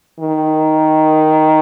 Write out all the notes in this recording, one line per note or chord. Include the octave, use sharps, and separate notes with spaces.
D#3